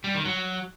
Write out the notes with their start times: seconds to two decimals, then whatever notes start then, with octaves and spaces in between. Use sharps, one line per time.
0.04 G3
0.15 D#3
0.25 F#3